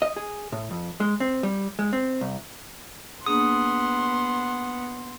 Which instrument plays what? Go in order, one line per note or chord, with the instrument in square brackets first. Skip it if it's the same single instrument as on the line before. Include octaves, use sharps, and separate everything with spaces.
[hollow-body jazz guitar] D#5
G#4
A2
F2
G#3
C4
G3
G#3
C4
C2
[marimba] A#3 D4 G#4 [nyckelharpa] B3 F#5 [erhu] C6 [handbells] D#6